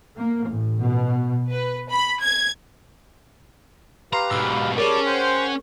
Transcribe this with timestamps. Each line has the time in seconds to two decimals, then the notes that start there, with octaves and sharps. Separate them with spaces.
0.16 A#3
0.45 A1
0.80 B2
1.51 B4
1.90 B5
2.23 G#6
4.13 G4 B4 F5 A#5 C6 C7
4.31 G#2 B2 E6
4.78 G3 C#4 G#4 A#4 A5 D6
5.06 C5 F#5 G5